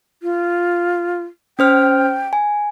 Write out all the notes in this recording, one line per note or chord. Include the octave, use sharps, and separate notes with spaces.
F4
C#4 C5 G5 F6
G#5